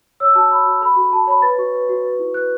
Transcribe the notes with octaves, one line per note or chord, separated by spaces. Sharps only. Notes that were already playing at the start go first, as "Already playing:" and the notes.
C#5 E6
F#4 A5
C#5 B5
F#4
A4 B5
F#4
F#4 A5
C#5 B5
B4 A6
F#4 C#6
B4
F#4
B4
E4
B4 F#6